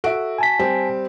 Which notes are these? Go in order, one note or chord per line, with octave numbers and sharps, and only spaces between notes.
F#4 A4 E5 D7
G#5 A5 B6
G3 C4